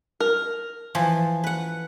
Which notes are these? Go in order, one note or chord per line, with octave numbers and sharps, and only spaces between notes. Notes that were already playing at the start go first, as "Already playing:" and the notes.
A#4
E3 F3
B4 F#5